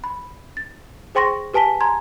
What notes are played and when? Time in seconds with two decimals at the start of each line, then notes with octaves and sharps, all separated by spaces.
0.04 B5
0.57 A6
1.15 G#4 C5 G5 C6 C#6 A#6
1.54 G4 B4 G#5 A5 B6 G7
1.80 G#5 A#5 C6 G#6